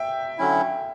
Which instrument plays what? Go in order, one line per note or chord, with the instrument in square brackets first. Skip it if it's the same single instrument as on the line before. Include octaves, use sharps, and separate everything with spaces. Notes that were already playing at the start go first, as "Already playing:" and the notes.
Already playing: [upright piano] E5 G5
[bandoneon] D3 F#3 C#4 E4